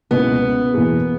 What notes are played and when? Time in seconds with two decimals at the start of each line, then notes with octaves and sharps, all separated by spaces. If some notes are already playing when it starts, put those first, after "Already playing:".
0.11 C#2 B2 A#3 B3 E4 G#4
0.74 E2 B2 A#3 E4 G#4